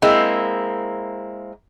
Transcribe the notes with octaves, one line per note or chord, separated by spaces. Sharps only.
G#3 A#3 C4 E4